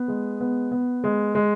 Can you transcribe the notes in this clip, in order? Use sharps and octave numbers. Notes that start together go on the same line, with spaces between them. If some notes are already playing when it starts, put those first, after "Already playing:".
Already playing: B3
G#3
B3
B3
G#3
G#3